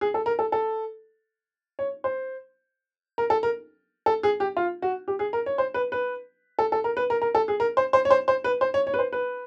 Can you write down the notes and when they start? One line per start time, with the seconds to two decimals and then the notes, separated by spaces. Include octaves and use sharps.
0.01 G#4
0.14 A4
0.26 A#4
0.39 A4
0.52 A4
1.79 C#5
2.04 C5
3.18 A#4
3.30 A4
3.43 A#4
4.06 A4
4.23 G#4
4.40 G4
4.57 F4
4.82 F#4
5.08 G4
5.19 G#4
5.33 A#4
5.46 C#5
5.58 C5
5.74 B4
5.92 B4
6.59 A4
6.72 A4
6.84 A#4
6.97 B4
7.10 A#4
7.22 A#4
7.35 A4
7.48 G#4
7.60 A#4
7.77 C5
7.93 C5
8.05 C#5
8.10 C5
8.28 C5
8.44 B4
8.61 C5
8.74 C#5
8.87 C#5
8.94 B4
8.99 C5
9.12 B4